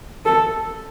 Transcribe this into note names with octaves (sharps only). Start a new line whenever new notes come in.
A4